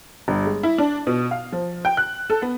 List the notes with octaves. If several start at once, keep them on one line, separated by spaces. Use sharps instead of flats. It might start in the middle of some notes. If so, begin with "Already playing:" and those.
G1
G#3
E4
D4
B2
F5
F3
G5
F#6
A4
B3